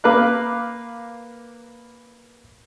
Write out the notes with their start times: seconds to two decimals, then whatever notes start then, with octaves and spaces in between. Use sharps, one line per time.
0.04 A#3 B4 F5 D6 F#6